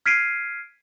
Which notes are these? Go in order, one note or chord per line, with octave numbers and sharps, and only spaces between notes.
F6 G#6 B6 C7 D7 D#7